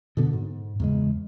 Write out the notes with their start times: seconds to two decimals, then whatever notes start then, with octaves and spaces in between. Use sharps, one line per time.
0.17 B2 D3 B3
0.33 G#2
0.80 E2 C#3 G#3